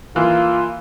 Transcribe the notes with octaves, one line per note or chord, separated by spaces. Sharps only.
E3 A#3 F4